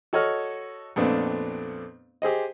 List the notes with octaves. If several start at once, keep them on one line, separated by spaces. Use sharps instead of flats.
F#4 A4 C#5 D#5 F6
F2 A#2 A3 B3 C4 D4
G4 G#4 C5 D#5